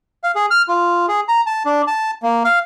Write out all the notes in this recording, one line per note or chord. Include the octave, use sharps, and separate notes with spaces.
F5
G#4
F6
F4
G#4
A#5
A5
D4
A5
A#3
F5